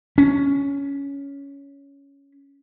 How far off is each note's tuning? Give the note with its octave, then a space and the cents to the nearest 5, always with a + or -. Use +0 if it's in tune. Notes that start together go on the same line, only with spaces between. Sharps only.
C#4 +10